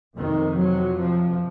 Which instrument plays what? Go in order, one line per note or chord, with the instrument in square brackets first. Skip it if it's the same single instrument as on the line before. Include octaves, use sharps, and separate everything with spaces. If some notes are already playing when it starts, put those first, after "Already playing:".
[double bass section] F2 C3 D#3
F#3
F3